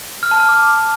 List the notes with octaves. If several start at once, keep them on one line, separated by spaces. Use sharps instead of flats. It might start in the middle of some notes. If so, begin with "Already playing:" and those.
F6
A5
F6
D6